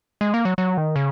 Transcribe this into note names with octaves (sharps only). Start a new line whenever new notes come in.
G#3
A#3
F#3
F#3
D#3
C#3